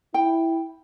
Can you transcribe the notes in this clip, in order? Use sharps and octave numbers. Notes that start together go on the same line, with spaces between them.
E4 G5